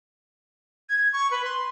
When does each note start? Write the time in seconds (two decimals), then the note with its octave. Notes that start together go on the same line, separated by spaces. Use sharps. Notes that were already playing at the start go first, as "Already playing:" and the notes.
0.89 G#6
1.13 C#6
1.31 B4
1.45 C6